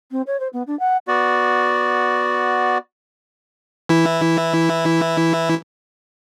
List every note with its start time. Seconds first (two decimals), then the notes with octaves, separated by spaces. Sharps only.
0.12 C4
0.27 C#5
0.40 C5
0.53 B3
0.67 D4
0.79 F#5
1.08 B3 F#4 D5
3.89 E3 E4